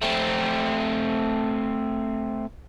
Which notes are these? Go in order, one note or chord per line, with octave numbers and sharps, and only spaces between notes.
A3 C4